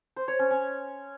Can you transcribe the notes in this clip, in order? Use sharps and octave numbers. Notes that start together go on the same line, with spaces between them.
C5
C#5
C#4
C#4